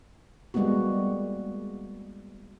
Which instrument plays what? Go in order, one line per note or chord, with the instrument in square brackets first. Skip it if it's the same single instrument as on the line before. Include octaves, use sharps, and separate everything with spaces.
[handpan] G3 G#3 A#3 B3 F#4